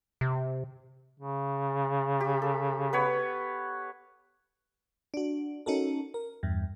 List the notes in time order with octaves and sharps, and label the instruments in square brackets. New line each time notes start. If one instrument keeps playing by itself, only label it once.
[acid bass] C3
[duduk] C#3
[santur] G4
A4
B3 B4 C#5
[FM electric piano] D4 F#4
C#4 D#4 F#4 A4 A#4
A#4
E2 G2